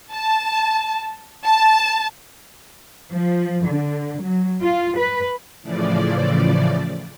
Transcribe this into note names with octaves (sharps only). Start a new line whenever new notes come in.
A5
A5
F3
D3
F#3
F4
B4
A2 C#3 E3 F3 D5